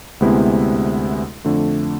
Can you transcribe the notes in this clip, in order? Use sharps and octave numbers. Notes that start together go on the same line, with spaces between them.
D2 C3 G#3 B3 E4
F2 D3 A3